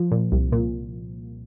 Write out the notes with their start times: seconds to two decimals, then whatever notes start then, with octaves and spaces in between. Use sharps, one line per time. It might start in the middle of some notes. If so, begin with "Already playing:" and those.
Already playing: F3
0.12 A#2
0.32 C2
0.52 A#2